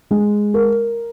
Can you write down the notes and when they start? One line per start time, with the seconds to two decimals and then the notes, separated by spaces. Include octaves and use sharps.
0.11 G#3
0.54 A#4